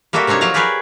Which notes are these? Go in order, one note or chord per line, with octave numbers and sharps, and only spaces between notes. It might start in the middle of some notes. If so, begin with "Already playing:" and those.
G3 A#3 F#4 A4 A#4 E5
C3 C4 D4 D#4 C#5
F3 F#3 F5 A5 A#5
G4 G#4 A#4 B4 C#5 D5